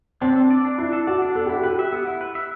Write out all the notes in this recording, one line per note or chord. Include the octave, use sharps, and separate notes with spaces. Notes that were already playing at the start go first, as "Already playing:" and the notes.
C4 D4
A4
D5
D4
D4 E4
A4
F#4 D5
D4
B3 A4
E4 G4
F#4
G4 B4
E5
B3
E4
B4
E5